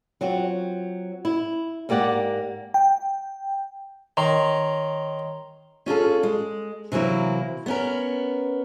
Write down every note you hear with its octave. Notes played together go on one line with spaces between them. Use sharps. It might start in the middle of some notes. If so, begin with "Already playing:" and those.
F#3 C4 F4 F#4
E4
G#2 A#3 G4 D5 F#5
G5
D#3 C#5 A#5 C6
C#4 F4 G#4 A4
G#3
C3 E3 F#3 A#3 E4
B3 C#4 A#4